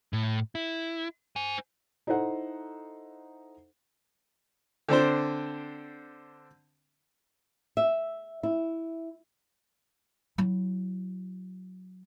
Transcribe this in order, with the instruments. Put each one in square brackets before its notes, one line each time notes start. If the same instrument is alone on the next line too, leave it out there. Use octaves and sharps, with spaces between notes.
[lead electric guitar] A2
E4
C5 G#5
[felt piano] D#4 E4 A4 C5 F#5
[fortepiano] D3 C4 D4 C5
[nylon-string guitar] E5
E4
[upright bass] F#3 E4